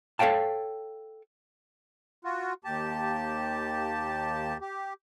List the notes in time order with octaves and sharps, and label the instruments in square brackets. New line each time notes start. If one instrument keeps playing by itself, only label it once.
[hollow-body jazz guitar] A4 C#5 F5 G5 A5
[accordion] F4 F#4
D#2 G4 A5
G4